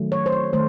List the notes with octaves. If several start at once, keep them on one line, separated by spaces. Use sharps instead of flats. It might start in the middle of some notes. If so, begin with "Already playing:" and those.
Already playing: D#3 F#3 A3
C#5
C5
C#5
D#3 A3 C5